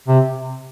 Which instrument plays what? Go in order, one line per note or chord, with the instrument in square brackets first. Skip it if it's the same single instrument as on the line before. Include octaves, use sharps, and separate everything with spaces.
[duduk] C3